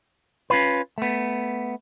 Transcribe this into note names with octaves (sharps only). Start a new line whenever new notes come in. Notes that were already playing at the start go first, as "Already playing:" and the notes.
C#4 F4 B4
A3 B3